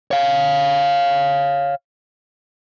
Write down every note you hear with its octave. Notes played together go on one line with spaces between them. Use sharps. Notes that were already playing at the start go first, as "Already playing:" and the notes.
C#5 F5